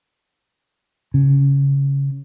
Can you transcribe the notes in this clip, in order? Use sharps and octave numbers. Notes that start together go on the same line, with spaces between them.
C#3